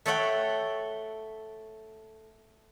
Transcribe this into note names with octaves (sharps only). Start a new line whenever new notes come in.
A3 A4 C#5 E5 F#5 G5